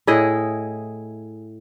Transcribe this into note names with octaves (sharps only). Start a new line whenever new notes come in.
A2 E4 G#4 D#5